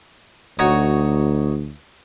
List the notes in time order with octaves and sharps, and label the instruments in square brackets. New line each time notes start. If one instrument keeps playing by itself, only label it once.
[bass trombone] D2 [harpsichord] D#4 F#4 C#5